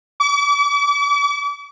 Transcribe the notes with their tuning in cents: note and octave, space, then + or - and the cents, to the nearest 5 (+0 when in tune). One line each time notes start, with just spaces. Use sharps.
D6 -40